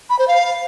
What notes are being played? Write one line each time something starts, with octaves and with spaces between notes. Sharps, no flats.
B5
C5
F5